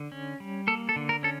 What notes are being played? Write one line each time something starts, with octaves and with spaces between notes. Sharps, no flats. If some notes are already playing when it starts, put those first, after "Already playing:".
Already playing: D3
C#4
G3
A#3 A4
A4
D3
A#4
C#4 A4